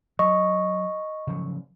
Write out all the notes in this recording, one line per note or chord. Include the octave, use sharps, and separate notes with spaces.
F#3 D#5 C#6
C#3 F3 F#3